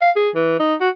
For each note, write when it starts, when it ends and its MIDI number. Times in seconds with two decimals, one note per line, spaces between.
0.01 0.11 77
0.16 0.30 68
0.35 0.57 52
0.59 0.75 63
0.80 0.89 66